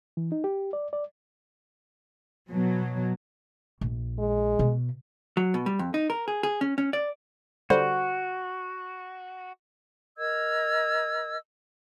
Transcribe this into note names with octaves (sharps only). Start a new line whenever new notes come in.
E3
D#4
G4
D5
D5
B2 F#3
A#1
G#3
B2
F#3
B2
G3
F2
D#4
A#4
G#4
G#4
C#4
C#4
D5
D3 G3 F#4 C5
A#4 D#5 E6 G#6